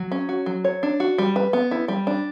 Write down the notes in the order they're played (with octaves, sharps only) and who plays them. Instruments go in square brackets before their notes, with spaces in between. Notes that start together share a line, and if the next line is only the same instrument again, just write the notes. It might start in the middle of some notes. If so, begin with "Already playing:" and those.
Already playing: [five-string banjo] F#3
C#4
F#4
F#3
C#5
D4
F#4
G3
B4
B3
E4
G3
D4